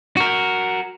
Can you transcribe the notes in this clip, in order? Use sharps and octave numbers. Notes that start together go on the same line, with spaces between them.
F#4 A#4